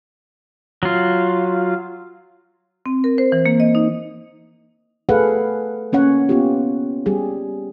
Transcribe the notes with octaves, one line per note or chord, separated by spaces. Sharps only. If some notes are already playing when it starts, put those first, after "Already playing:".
F#3 F4
C4
A#4
C5
E3
A#3
D#5
D#4
A3 G#4 A4 B4 F5 F#5
A#3 C#4 C#5 F#5
B3 F4 G4
G3 G4 G#4